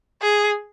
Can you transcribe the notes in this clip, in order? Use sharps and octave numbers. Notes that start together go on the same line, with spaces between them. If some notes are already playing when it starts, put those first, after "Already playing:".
G#4